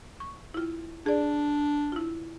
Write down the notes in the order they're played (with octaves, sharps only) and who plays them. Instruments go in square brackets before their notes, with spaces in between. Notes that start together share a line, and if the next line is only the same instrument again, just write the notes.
[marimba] C#6
E4 F4
[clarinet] D4 [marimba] G#4 D5
[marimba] E4 F4